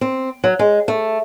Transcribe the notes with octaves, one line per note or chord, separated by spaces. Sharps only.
C4
F#3
G#3
A3